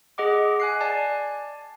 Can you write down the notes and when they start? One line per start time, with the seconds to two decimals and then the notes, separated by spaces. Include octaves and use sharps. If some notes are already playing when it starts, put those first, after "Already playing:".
0.18 G#4 D#5 F#5 D6
0.60 G#5 F#6 C7
0.81 D5 G#5 A5